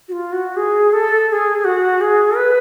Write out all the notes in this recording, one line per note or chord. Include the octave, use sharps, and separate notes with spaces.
F#4
F4
F#4
G#4
A4
A4
G#4
F#4
G#4
B4